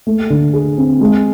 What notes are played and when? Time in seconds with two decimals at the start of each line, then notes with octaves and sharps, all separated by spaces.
0.07 A3
0.30 D3
0.53 G#4
0.78 C4
1.01 G#3